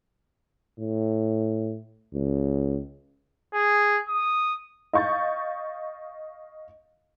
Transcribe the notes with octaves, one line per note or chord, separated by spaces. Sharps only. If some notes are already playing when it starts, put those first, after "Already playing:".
A2
C#2
G#4
D#6
D#5 F5 C#6 G6 A6